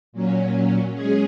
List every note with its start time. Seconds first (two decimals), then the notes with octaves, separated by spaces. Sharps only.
0.12 A#2 F#3 C#4
0.94 G#3 C#4 G#4